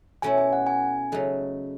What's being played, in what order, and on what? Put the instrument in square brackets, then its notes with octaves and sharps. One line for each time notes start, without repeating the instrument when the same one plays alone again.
[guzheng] B2 A3 C#4 E4 [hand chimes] G#5
[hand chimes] G#5
F#5
G#5
[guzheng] C#3 F#3 A3 D#4